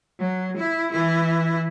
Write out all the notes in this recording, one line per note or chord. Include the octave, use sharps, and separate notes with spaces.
F#3
E4
E3 E4